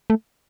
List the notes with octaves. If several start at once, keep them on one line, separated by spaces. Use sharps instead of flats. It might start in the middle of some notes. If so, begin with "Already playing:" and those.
A3